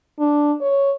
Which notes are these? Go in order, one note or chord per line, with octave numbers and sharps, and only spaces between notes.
D4
C#5